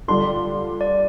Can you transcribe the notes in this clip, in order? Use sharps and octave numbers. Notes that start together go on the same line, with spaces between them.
D3 G3 D4 F4 C6
D5